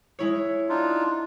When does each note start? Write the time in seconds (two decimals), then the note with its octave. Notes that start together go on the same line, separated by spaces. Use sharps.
0.19 G#3 E4 C#5
0.69 D4 D#4 F4